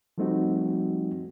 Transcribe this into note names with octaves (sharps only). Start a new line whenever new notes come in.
F3 G3 A3 C4 D#4 F#4